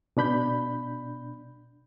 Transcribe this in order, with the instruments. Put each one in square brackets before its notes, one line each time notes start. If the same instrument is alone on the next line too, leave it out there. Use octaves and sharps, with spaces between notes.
[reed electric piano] B2 D4 B5 G6